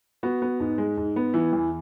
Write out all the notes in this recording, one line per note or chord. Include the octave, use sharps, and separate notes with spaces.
B3 F#4
B3
G#2
G#3
G#2
B3
E3 E4
E2